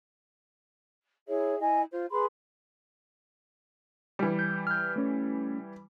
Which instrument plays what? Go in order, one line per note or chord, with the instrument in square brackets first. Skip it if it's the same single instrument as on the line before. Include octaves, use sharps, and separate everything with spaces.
[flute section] E4 G#4 C#5 E5
E4 D#5 G#5
F4 C5
G#4 B4 B5 C6
[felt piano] E3 G3
[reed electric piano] G6
F6 G6
A3 C#4